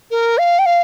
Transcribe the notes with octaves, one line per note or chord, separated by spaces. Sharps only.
A#4
F5
G5
F5